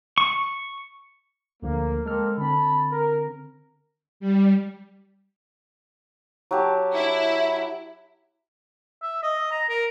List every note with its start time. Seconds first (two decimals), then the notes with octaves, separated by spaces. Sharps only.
0.18 C#6
1.63 D2 D3 F3 A#3
2.06 G#3 A#3 C4 A4 A#4 F6
2.38 D3 C4 A5 B5
2.91 A#4
4.20 G3
6.51 F#3 G4 A5
6.94 E4
9.02 E5
9.23 D#5
9.51 A#5
9.69 A#4